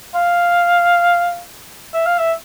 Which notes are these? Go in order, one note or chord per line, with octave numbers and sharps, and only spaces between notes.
F5
E5
F5
E5